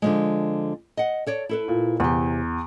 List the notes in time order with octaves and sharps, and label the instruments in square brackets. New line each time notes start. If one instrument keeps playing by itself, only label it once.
[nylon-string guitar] D3 F3 G#3
D#5 F#5
A4 C#5 D5
E4 A4 B4
[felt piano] A#2
[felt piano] E2 [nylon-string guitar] C3 G4